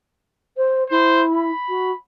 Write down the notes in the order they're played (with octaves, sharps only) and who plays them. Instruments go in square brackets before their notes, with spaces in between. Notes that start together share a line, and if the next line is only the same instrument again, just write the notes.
[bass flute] C5
[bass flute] E4 [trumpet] C5
[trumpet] B5
[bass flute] F#4